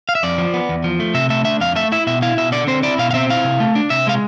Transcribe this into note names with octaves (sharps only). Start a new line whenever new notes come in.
F5
E5
F2 D5
F3
B3
E2
F3
A3
C3 E5
A3 E5
D4 E5
F2 F5
A3 E5
E4 E5
B2 E5
E4 F5
B2 E5
D3 D5
C4 C5
E4 D5
B2 F5
F5
C4 E5
E4 F5
C3
A3
D4
C3 E5
G#3 F5